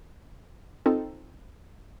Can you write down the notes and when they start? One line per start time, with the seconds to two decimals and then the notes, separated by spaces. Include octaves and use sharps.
0.86 C4 D#4 F4 A4